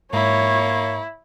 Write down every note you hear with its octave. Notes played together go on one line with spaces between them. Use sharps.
G#2 A#3 E4 C#5